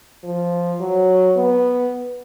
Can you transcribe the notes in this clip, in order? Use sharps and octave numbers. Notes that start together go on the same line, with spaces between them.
F3
F#3
B3